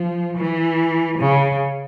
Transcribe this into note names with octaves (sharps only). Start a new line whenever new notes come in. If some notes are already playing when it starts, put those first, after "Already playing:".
Already playing: F3
E3
C#3